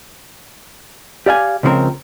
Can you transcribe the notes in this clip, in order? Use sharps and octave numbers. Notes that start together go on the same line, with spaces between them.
G4 D5 F5 G#5
C#2 C#3 F3 G3 C4 A#4